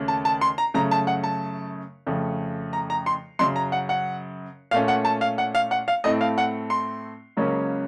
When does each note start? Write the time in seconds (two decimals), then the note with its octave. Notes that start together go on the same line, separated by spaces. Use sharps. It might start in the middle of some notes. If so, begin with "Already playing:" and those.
Already playing: D#2 C#3 A3 C#4
0.08 A5
0.25 A5
0.41 C6
0.58 A#5
0.74 F#2 C#3 A3 A#5
0.91 A5
1.07 F#5
1.24 A5
2.07 F2 C#3 A3
2.73 A#5
2.90 A#5
3.06 C6
3.39 F#2 C#3 F#3 C6
3.56 A#5
3.72 F#5
3.89 F#5
4.71 A#2 A3 C#4 F5
4.88 F#5
5.05 A5
5.21 F5
5.38 F#5
5.55 F5
5.71 F#5
5.88 F5
6.04 A2 A3 C4 D#5
6.21 F5
6.38 F#5
6.70 C6
7.37 C#2 C#3 F#3 A#3 C#4